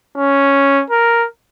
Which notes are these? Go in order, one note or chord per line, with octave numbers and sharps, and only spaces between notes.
C#4
A#4